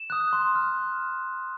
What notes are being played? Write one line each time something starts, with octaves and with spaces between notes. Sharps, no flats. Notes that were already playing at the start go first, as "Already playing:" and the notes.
Already playing: E7
D#6 F#6
C6
F6